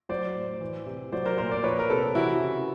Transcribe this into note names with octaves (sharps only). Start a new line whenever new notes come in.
F#3 C5 D5
A2
E3
C3
F#3 C5 D5
A#4 C5
A#2 A#4 C5
C5 D5
F3 B4 C#5
A#4
C3 A4 B4
E3 E4 F#4
C#3